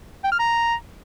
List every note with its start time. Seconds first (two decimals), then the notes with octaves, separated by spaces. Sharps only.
0.24 G5
0.32 F6
0.39 A#5